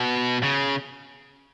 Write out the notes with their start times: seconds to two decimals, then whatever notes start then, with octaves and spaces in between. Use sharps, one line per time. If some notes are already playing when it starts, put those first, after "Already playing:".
Already playing: B2
0.43 C#3